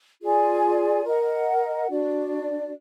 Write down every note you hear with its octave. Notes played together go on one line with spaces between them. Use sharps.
F4 G#4 D5 G#5
A#4 D#5 F#5
D4 F#4 D5